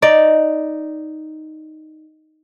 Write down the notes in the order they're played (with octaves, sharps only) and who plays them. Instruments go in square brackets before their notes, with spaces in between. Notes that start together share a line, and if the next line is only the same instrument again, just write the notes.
[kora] D#4 D5